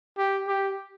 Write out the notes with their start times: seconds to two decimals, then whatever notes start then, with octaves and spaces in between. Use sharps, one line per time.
0.18 G4
0.47 G4